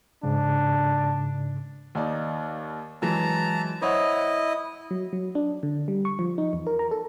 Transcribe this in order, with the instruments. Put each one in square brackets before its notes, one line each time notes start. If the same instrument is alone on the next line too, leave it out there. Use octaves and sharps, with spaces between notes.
[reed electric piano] G#2 C#3 [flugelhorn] D4
[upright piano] D#2 D#4 D5
[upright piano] F#2 E3 G#3 [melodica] A5 A#5
[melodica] E4 D#5 [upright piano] C5 C#5 F#5
[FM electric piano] F#3
F#3
D4
D3
G3
C#6
F3
D#4
E2
A#4
A#5
A4